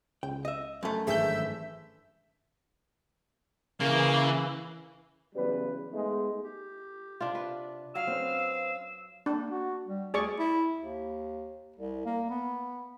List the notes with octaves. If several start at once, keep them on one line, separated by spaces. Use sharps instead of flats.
C#2 G5
D#5 E5
F#2 A3
G#1 G2 E3 G#4 E5 G6
C#3 E3 A#3
E2 C#3 F#3 G3 B4
G#3 A3 B3 D#4
G4
C3 D4 F4
B4
F#3 F5 E6
C4 C#4 B4
A#3 D4
F#4
G3
D2 G#4 D5 C#6
E4
D#2
C2
A#3
B3